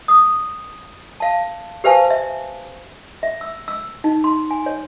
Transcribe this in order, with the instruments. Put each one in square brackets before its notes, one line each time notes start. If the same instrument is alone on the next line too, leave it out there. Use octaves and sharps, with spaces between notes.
[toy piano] D#6
F5 A5
G4 B4 C5 F5 G#5 A5
E5
E5
E6
E6
D#4
C6
G#5
C#5